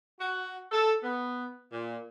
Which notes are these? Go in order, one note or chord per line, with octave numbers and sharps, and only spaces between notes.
F#4
A4
B3
A#2